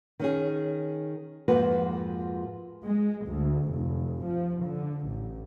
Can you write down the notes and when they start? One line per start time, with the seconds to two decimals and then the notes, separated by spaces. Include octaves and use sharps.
0.19 D#3 C#4 G#4
1.48 F2 G#2 F3 A#3 F#4 B4
2.83 G#3
3.26 D2
3.72 F1
4.26 F3
4.64 D3
5.07 A1